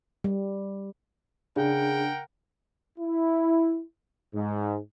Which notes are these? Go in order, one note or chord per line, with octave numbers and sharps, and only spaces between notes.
G3
C#3 D4 A#4 F#5 G5
E4
G#2